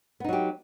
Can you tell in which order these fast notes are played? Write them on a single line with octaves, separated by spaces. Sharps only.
B3 D#4 F#3 G4